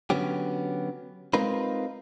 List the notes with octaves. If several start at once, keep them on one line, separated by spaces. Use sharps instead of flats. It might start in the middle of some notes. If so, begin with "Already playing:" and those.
D3 F#3 B3 C#4 G4
G#3 C4 D#4 F4 A#4 B4